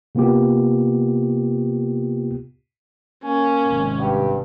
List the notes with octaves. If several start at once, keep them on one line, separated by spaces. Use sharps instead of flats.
C3 A#3 B3 F4 G4
A#3 C#4 G#5
G#1 G#2 C3
G2 G4